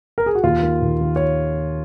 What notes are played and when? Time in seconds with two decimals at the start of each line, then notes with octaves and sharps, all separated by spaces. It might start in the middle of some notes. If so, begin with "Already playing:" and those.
0.18 A#4
0.26 G#4
0.35 F#4
0.43 D#2 F4
0.62 D#3
0.82 D#2
1.01 D#3
1.16 C#5